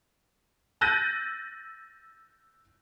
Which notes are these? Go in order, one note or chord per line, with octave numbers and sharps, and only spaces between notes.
E6 F#6 G6 A6 A#6 D#7